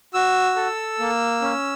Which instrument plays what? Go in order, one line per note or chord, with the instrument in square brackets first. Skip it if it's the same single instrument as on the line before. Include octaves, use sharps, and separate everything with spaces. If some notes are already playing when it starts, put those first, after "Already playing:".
[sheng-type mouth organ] F#4 E6
A4
A#3
C#4